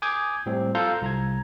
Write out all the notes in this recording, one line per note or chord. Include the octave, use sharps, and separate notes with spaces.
G#5 D6 D#6 G6 G#6
A2 G3 C4
F4 A4 F5 A#5 G6
C2 A#5 G#6